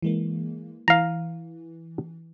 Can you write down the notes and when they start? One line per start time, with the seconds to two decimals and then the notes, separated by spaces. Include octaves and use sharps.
0.02 E3 G#3 A#3
0.88 E3 F5 A#5